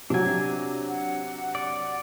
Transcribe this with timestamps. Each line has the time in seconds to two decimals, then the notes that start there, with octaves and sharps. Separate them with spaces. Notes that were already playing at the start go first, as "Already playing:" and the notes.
0.10 C3 F#3 D4 G#5
0.89 F#5
1.55 D5